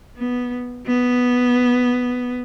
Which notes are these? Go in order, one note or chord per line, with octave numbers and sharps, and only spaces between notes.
B3
B3